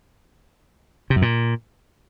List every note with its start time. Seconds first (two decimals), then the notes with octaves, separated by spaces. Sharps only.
1.10 C3
1.16 F#2
1.22 A#2